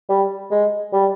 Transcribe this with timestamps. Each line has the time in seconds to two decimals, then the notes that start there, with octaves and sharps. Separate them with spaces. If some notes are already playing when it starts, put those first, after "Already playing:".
0.09 G3
0.51 G#3
0.93 G3